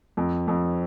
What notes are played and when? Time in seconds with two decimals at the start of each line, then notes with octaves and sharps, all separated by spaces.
0.17 F2
0.48 F2